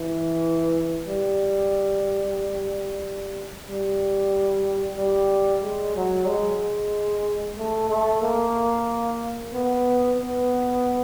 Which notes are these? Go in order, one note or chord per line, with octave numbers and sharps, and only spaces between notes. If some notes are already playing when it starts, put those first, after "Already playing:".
Already playing: E3
G3
G3
G3
G#3
F#3
G#3
A3
A3
A#3
B3
B3